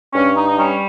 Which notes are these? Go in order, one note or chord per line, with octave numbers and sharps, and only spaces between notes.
G2 C#4
D#4
D#4
G3 C#4